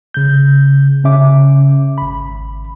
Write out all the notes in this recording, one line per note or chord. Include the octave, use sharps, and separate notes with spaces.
C#3 G6
C#3 C#4 E5 D6
G#1 B5